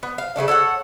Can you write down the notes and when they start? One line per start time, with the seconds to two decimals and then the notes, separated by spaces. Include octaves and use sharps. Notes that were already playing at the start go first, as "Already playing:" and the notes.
0.03 B3
0.18 F5
0.36 C#3 E3 A3 D4
0.48 A4 C#5 F5 F#5